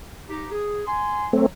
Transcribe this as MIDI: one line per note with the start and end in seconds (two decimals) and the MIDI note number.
0.29 0.46 63
0.29 0.46 67
0.51 0.82 68
0.87 1.28 80
0.87 1.28 84
1.33 1.46 54
1.33 1.46 57
1.33 1.46 60